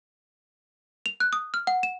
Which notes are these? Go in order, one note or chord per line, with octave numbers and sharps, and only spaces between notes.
F7
F#6
D#6
F6
F#5
E7